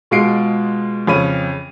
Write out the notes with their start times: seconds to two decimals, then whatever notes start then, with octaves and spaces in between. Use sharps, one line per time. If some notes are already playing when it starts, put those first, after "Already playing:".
0.11 B2 G#3 F4 C7 D7
1.07 F2 C#3 C#4 B5 D#7